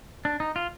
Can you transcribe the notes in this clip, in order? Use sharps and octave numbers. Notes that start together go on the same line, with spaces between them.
D4
D#4
F4